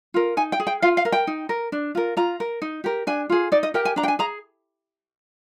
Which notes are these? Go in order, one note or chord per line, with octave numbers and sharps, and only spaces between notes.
F4 A#4
D#4 G#5
G5
G#4
G5
F4 F5
F5
A#4
G5
D#4
A#4
D4
F4 A#4
F4 A#5
A#4
D#4
G4 A#4
D4 G#5
F4 G#4
D#4 D5
D#5
G4 A#4 G5
G#5
D4 A#5
G5
G#5
G#4 A#5